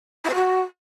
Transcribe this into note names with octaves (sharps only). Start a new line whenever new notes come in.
E4
C5
F#4